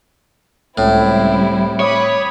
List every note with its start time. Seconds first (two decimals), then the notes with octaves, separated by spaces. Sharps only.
0.78 C#2 A2 G3 C4 E4
1.80 C#5 B5 D6 D#6